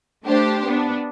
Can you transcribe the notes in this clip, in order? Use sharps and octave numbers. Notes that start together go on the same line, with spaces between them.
A3 D4 G4 C5
B3 D4